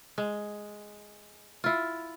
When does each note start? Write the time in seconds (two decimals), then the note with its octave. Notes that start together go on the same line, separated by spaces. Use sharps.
0.18 G#3
1.64 E4 F4